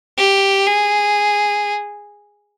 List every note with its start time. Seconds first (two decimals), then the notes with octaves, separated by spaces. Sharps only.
0.17 G4
0.67 G#4